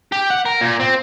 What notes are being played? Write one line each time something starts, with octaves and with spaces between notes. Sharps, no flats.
G4
F#5
A#4
A#2
C4